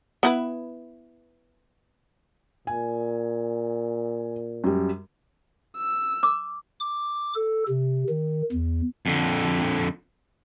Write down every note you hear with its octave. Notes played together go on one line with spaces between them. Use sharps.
B3 E4 B4
A#2 G#5
F#2 G3
E6
D6
D6
A4
C3
D#3
E2
F2 D3